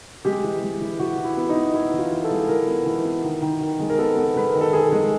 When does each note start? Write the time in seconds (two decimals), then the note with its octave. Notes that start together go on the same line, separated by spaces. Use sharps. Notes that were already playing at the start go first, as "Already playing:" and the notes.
0.25 G#3 G4
0.44 E3
0.62 G#3
0.81 E3
0.99 E3 F#4
1.18 E3
1.24 E4
1.37 B3
1.49 D#4
1.55 B3
1.74 B3 E4
1.93 E3
1.99 F4
2.12 E3
2.24 A4
2.31 G#3
2.48 E3 A#4
2.67 B3
2.86 E3
3.05 B3
3.24 D#3
3.42 D#3
3.61 D#3
3.80 G#3
3.90 A#4
3.98 B3 A4
4.17 B3
4.36 G#3 B4
4.49 A#4
4.55 D#3
4.61 A4
4.73 D#3 G#4
4.92 G#3